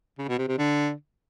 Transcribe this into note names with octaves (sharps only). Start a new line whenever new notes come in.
C#3
B2
C3
C3
D3